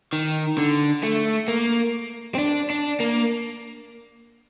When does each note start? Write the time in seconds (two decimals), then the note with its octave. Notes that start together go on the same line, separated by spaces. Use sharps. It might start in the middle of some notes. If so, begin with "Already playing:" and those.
0.13 D#3
0.58 D3
1.03 A3
1.48 A#3
2.35 C4
2.39 D4
2.70 D4
3.00 A#3